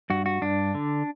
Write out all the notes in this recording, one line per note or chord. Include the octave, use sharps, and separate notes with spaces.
G2 F#4
F#4
G2 D4
D3